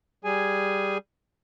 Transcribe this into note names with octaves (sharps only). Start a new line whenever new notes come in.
G3 G#4 G#5